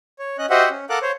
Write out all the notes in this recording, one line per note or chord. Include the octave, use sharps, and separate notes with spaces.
C#5
C#4 D#5 F#6
F#4 G4 C5 D#5 E5 F#5
C#4
A4 A#4 F5 F#5 D6 F#6
C5 C#5